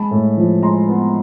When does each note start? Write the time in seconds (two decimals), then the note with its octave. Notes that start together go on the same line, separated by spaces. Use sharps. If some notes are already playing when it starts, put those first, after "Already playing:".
Already playing: G#3 A5 B5
0.11 A2
0.37 F3
0.62 G#3 A#5 C6
0.88 B3